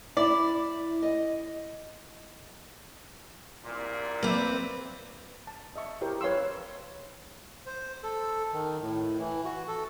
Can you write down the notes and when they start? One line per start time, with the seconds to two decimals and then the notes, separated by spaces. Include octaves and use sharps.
0.17 E4 D5
1.03 D#5
3.64 C2 A#2
4.23 A#3 C4 B4 D5 E5
5.47 A5
5.76 D#5 E5 C#6
6.01 E4 G4 A#4 C5
6.21 B4 C#5 F5 C6 E6
7.66 C5
8.03 A4
8.53 D#3
8.81 A2
9.19 E3
9.45 F#4
9.68 A4